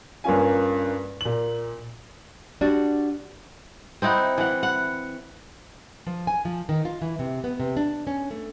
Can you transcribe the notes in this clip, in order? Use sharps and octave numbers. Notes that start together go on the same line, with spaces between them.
G2 A#3 C#4 F4 G#5
A#2 F#7
G3 D4 F#4
C4 D#4 E4 F#5
E3 F#5
F#5
F3
G#5
F3
D#3
F4
E3
C3
B3
C3
D4
C#4
A3